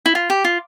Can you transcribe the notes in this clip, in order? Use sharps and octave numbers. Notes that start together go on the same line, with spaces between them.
E4
F4
G4
F4